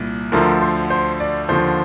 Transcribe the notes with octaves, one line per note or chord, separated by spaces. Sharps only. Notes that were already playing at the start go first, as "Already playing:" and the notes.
Already playing: C2 A#2
D2 D3 F3 A#4
C5
C5
D5
D#2 D3 F3 C5